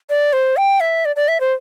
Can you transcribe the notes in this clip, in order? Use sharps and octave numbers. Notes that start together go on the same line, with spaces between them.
D5
C5
G5
E5
D5
D5
E5
C5